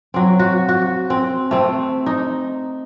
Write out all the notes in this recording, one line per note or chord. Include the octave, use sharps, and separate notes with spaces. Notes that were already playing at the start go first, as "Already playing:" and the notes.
F#3 C4
F#4
F#4
C4
A3 C4
D#4